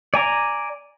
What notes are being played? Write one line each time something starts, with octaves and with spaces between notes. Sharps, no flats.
D5 G#5 A#5